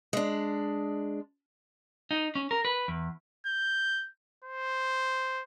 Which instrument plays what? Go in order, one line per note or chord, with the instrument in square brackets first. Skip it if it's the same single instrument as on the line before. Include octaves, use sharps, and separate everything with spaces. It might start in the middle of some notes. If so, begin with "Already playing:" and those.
[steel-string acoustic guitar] G#3 D4
[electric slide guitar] D#4
C#4
A#4
B4
E2
[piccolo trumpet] G6
C5